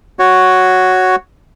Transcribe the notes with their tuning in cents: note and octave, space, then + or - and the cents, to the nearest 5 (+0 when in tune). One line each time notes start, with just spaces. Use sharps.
F#4 +0 C#5 +0